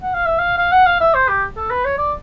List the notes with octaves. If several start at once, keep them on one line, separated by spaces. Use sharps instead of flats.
F#5
F5
E5
F5
F5
F#5
F5
E5
C5
G4
A4
B4
C#5
D5